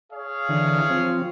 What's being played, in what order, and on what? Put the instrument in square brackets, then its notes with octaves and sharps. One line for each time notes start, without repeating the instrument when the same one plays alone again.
[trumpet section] G#4 C#5 F5
[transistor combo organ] D3 E3
F3 C4